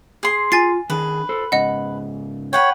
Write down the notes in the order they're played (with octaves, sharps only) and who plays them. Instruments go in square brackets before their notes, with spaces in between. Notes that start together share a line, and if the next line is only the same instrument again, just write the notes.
[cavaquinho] G#4 C6
[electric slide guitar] F4 [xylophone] G#5 A6 C7
[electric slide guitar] D#3 D4 G#4 [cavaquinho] B4
[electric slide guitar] A4 C5
[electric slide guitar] G#2 C#3 [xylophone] D#5 F#5
[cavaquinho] B4 F#5 G5 [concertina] C#5